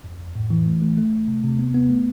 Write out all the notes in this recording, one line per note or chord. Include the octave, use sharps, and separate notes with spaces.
F2
F2
A2
E3
A3
A3
A3
A3
C3
C3
B3
B3
A3